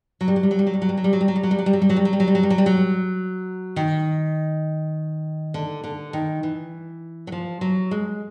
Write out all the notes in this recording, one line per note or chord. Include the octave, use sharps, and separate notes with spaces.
F#3
G3
F#3
G3
F#3
G3
F#3
G3
F#3
G3
F#3
G3
F#3
G3
F#3
G3
F#3
G3
F#3
G3
F#3
G3
F#3
G3
F#3
G3
F#3
G3
F#3
G3
F#3
G3
F#3
D#3
D3
D3
D#3
E3
F#3
F3
F#3
G#3